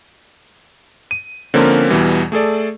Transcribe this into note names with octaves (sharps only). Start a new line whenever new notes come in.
D#7
D3 F3 A#3 C4 C#4 A#4
E2 B2 E3 G3
A3 G#4 A4 D5